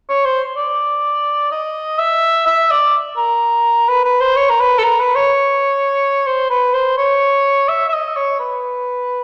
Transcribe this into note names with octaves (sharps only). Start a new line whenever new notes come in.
C#5
C5
D5
D#5
E5
E5
D5
A#4
B4
B4
C5
C#5
A#4
B4
A4
A#4
B4
C#5
C5
B4
C5
C#5
E5
E5
D#5
C#5
B4